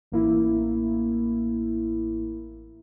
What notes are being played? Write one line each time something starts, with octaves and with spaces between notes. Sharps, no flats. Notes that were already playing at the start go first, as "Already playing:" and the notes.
A1 A#3 E4